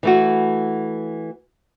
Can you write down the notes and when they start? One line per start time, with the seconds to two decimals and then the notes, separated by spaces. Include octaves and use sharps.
0.03 E3 A3 F#4